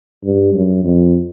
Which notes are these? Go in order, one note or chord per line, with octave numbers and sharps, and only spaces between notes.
G2
F#2
F2